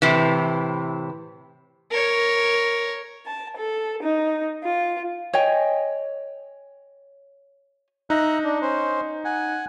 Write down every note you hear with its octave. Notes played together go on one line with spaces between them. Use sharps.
A2 C3 E3
A#4 C#5
A5
A4
D#4
F4
C#5 D#5 G5 G#5
D#4 E5 A#5 F#6
D4
C#4 C5
F#5 G#5